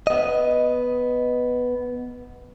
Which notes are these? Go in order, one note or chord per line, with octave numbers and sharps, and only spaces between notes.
B3 D#5